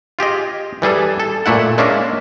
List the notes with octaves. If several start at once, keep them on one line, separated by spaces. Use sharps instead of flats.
F4 G4 G#4 D#5
E3 G3 G#4 A4
A4
A#2 A3 E4 F#5
G#3 A#3 C#4 D4 A#4 E5